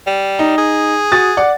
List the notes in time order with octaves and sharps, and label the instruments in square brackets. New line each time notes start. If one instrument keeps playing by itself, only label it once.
[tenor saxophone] G3
[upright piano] D#4
[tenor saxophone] G#4
[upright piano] F#4 D#6 A6
D5 F#5